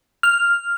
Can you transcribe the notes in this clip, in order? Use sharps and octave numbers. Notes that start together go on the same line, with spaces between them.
F6